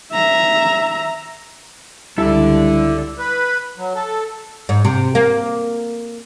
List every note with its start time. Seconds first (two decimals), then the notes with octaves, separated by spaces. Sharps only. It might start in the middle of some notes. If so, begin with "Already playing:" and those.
0.12 E5 A#5
2.18 C#2 D3 G3 E4 A4 D5
3.19 B4
3.77 F#3
3.95 A4
4.69 G#2
4.85 C3
5.15 A#3